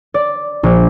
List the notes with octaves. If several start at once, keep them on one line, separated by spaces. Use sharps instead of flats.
D5
A#1